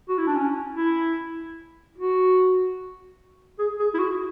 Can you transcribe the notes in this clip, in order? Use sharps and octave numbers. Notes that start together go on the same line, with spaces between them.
F#4
E4
D4
C#4
E4
F#4
G#4
G#4
E4
F#4